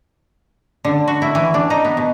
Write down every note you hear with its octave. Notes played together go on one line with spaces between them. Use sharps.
D3
F#4
E4
E3
D4
D#4
B3
B2